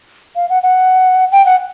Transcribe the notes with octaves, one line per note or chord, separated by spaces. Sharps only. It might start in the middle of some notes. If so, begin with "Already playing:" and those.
F5
F#5
F#5
G5
F#5